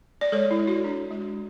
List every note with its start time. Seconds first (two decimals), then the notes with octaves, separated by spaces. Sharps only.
0.21 D5
0.32 G#3 A4 C#5
0.51 E4
0.59 G#3
0.67 F#4
0.84 D4
1.11 G#3